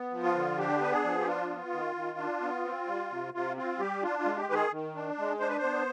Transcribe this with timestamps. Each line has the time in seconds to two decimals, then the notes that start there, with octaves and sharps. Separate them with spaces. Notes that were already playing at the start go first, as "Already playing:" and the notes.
Already playing: B3
0.11 F3
0.22 F4
0.35 D3
0.58 D4 G4
0.80 B3 B4
0.92 G#4
1.04 F3
1.20 G4
1.26 D4 F4
1.50 B3
1.73 D#3
1.95 D#3
2.18 D4
2.41 B3
2.65 C4
2.87 G3
3.10 C3
3.33 C3 F4
3.57 C4 F4
3.79 G3 G4
4.02 D4 F4
4.19 F4
4.25 G#3
4.37 G4
4.49 D#3 B4
4.54 G#4
4.72 D#3
4.95 D4
5.18 G#3
5.40 D4 C5
5.49 B4
5.58 C5
5.63 B3